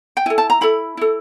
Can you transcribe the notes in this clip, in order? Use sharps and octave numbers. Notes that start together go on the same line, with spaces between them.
G5
E4 A4 G#5
A5
A#5
E4 A4 B5
E4 A4